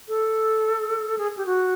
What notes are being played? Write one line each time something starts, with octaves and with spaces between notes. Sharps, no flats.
A4
G#4
G4
F#4